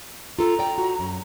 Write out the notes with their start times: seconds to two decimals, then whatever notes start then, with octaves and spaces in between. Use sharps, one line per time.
0.39 F4 A4 A#5
0.59 D5 G5
0.78 F#4
0.99 F#2